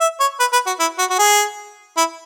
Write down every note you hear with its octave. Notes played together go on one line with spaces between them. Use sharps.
E5
C#5
B4
B4
F#4
E4
F#4
F#4
G#4
E4